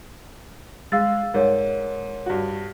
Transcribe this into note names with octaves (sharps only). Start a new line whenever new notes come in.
G#3 F5 E6 A6
G#2 A#4 C#5
G2 F#4